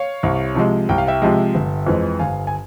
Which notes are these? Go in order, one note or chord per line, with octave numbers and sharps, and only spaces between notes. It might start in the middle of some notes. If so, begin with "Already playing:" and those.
Already playing: C#5 F5
C2
C3 F3 G#3
C2 G5
F5
E5 G5
C3 F3 G#3
G1
F2 E3 G#3
G1 F5 G#5
G#5